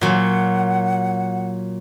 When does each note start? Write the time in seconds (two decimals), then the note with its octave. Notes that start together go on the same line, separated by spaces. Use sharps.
0.01 A#2 F#3 F#5